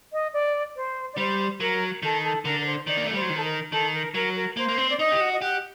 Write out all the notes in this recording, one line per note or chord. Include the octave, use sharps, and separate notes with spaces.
D#5
D5
C5
D5
G3 C5
F#3 A#4
D#3 A4
A4
D3 A#4
A#4
C5
D#3 D5
A#3
A3
G3 C5
F#3
D#3
A4
A#4
D#3 A4
A#4
F#3 A#4
A#4
A#3 C5
A#3
C4
D5
D#4 D#5
G4
F#4
D#5
G4 F#5